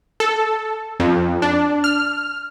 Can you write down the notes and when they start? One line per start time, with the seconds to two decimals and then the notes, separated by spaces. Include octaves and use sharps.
0.20 A4
1.00 F2
1.42 D4
1.84 F6